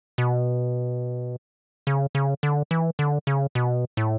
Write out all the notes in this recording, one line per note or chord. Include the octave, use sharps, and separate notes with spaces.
B2
C#3
C#3
D3
E3
D3
C#3
B2
A2